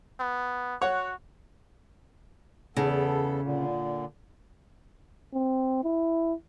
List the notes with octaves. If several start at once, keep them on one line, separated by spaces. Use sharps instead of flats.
B3
F#4 C#5 F#5
E2 C#3 B3 A4
A#2 D3
C4
E4